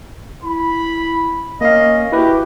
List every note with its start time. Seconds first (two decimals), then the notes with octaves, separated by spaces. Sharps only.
0.43 E4 B5
1.61 A#3 C#4 D#5 F5
2.12 E4 F#4 G4 B4